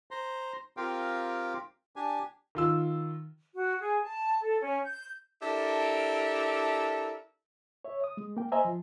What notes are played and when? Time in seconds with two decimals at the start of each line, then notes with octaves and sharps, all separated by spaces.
0.11 C5 A#5 C6
0.77 C4 F4 G4 A#4 F5 G5
1.96 D4 G4 G#5
2.55 D#3 F4 E6
3.54 F#4
3.80 G#4
4.01 A5
4.39 A4
4.60 C#4
4.83 G6
5.42 D4 E4 G4 A4 A#4
7.85 C#5 E5
8.04 D#6
8.17 G#3
8.37 A#3 G5
8.52 C5 D#5 E5 G#5 A#5
8.65 F3